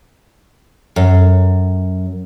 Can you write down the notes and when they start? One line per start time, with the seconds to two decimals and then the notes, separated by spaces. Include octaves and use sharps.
0.96 F#2